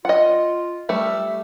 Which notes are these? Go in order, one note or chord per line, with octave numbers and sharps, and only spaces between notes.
F4 D#5 F#5
G3 A3 E5